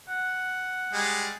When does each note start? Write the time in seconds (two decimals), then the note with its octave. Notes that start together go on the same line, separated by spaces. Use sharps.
0.08 F#5
0.93 G3 G#3